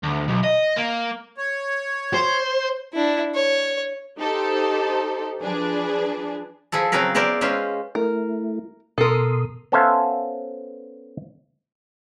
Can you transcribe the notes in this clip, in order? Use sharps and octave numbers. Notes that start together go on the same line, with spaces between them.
D2
B1
D#5
A#3
C#5
C5
D4 E4
C#5
D#4 G4 A4 C5
F3 D4 G#4 B4
F3 E4 G#4 A4
C#3 F#3 C4 G#4 A#4 B4
B3 E4 A#4 C5 D5
G#3 C#4 F4 B4 C5
A3 E4 A#4
B2 A4 A#4 C6 D#6
B3 C#4 A4 C5 E5 F5